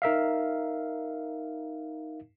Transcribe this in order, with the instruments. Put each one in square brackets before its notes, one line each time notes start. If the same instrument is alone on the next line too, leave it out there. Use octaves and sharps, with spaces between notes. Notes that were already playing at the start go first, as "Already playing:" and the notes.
[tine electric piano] D#4 A#4 E5 F5